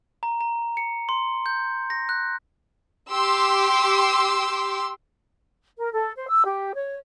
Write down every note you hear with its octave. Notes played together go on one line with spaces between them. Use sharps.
A#5
A#5
C#7
C6
G6
A#6
F#6
G4 C6 D6 E6
A#4
A4
C5
E6
G4
C#5